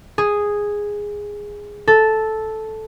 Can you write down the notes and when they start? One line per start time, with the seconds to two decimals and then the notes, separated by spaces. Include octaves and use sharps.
0.18 G#4
1.87 A4